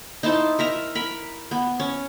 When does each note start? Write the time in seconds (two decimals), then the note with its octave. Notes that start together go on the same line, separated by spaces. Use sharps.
0.23 D#4 E4 C5 A5
0.59 A#4 E5 A#5
0.95 A#4 B5
1.51 B3
1.80 C#4